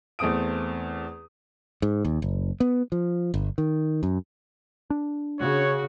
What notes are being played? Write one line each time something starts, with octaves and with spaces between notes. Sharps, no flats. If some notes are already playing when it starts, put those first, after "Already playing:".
E2 A3 C4 D#6 D7
G#2
D#2
F#1
B3
F3
G1
D#3
F#2
D4
C#3 F#4 C#5